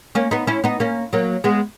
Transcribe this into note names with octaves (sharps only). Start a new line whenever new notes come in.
A#3 C#4
B3 D#4
C#4 E4
B3 D#4
A#3 C#4
F#3 A#3
G#3 B3